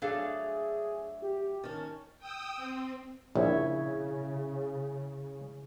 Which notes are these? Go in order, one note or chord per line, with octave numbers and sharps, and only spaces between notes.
F#3 A3 D4 G#4 A4 F5
G4
D#3 C#4 A5
G5 D#6 E6
C4
A#1 C#3 E4 C#5 E5